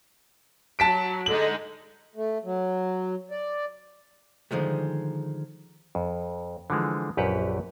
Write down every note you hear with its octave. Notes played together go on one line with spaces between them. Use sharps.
F#3 A5 B6 D7
D3 G#3 D#4 F#7
A3
F#3
D5
D3 D#3 F3 G#3 A3
F2
D3 E3 F3 G#3
A#1 F#2 G4 B4 F#5